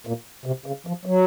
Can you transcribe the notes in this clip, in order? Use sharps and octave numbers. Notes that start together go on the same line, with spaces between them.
A#2
C3
C#3
F3
F#3